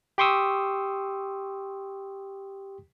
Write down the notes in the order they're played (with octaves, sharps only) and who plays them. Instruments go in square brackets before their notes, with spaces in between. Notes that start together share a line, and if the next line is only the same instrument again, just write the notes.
[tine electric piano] G4 G5 C6 C#6 D#6 E6